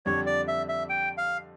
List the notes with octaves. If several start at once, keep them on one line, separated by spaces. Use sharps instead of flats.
F2 D3 G3 D4 G4 C#5
D5
E5
E5
G5
F5